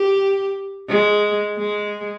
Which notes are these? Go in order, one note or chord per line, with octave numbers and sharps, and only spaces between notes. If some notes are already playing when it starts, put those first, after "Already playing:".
Already playing: G4
G#3
G#3